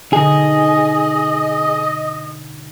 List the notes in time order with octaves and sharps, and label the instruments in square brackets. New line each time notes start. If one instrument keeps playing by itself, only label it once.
[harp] B2 D3 D#4 [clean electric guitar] G#4 [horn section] D#5